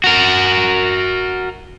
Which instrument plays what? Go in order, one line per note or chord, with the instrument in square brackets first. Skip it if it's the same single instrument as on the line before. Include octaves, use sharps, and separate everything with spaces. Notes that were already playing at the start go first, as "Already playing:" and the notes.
[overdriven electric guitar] F#4 A#4